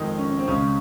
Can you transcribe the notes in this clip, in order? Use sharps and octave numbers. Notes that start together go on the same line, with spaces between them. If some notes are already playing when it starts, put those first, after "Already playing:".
Already playing: F2 D#3 G#3 D#4
C#4
C#4
C4
C#2 C#3 G#3 C#4